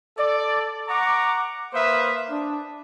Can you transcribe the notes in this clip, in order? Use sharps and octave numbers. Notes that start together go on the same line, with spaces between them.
A4 D5
F#5 A#5 C#6 D6
A#3 B4 C5 E5 F5 D#6
D4